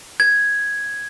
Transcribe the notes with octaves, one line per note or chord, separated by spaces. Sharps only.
G#6